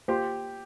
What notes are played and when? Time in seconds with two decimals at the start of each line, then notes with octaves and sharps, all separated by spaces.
0.08 A#3 F4 G4 C5